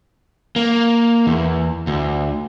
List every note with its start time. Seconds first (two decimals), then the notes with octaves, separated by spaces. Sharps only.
0.56 A#3
1.27 E2
1.87 D2